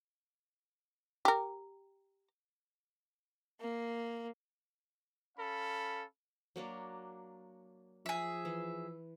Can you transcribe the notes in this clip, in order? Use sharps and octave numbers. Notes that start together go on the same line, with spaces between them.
G4 A#4
A#3
C#4 A4 F5 B5
F#3 A#3 D4
F3 G#4 E5
E3